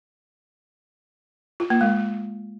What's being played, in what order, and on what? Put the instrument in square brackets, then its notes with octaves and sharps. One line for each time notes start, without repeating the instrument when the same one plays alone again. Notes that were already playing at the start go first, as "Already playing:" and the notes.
[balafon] F4
A#3
G#3